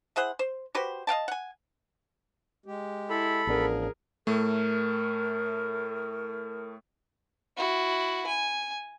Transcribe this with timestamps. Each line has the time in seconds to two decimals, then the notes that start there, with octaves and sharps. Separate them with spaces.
0.16 E4 G#4 C5 F#5
0.39 C5
0.75 F#4 G4 B4 C5
1.07 D#5 F5 G5 A5
1.28 F#5 G#5
2.66 G#3 G4
3.10 E4 A4 B5
3.47 A1 F3 B3 D4 G#4 A#4
4.27 A2 A3 A#4
7.57 E4 F#4
8.27 G#5